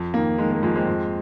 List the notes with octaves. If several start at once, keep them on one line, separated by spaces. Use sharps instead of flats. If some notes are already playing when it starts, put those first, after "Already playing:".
Already playing: F2
D#3 A#3
D#3 G#3
A#3
F2 G#3
G#3 C4
F2